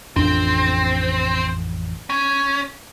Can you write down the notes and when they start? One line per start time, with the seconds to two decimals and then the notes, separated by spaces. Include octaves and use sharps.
0.16 A1 F2 C4 D4
2.10 C#4